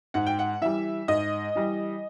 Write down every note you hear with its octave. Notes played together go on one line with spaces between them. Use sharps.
G#2 F#5
G5
F#5
E3 G3 E5
G#2 D#5
E3 G3